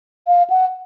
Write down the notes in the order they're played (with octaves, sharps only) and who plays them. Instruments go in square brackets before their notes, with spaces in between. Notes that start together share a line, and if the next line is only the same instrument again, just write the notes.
[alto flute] F5
F#5